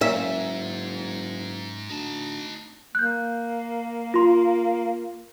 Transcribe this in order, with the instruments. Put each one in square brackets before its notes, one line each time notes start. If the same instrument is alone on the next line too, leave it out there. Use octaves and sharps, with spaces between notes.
[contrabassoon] F#1 [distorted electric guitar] G#2 [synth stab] A#3 C#4 [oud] E5
[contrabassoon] D2 [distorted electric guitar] D#4 A5
[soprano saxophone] A#3 [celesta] F#6 G6
[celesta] F4 C6